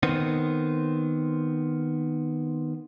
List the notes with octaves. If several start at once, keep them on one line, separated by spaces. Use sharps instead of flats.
D#3 B3 C4